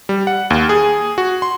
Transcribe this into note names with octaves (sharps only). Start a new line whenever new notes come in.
G3
F#5
D#2
G#4
F#4
C6